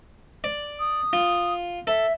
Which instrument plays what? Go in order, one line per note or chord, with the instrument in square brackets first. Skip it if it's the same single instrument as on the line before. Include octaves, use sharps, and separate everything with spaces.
[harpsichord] D5
[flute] D#6
[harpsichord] F4
[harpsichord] A4 [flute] E5